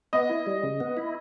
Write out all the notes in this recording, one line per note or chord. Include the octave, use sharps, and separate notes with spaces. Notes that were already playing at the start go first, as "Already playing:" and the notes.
B3 D#5
E4
G3
C#3
B3
E4